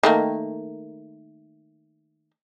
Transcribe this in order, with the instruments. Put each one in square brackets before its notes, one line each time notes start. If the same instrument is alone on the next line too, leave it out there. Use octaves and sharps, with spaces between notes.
[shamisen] D#3 A3 A#3